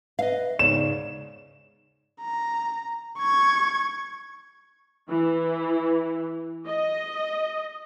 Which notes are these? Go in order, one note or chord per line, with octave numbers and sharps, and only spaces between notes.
B4 D#5 F5
G#2 C#3 C#5 D5 E7
A#5
C#6 G#6
E3
D#5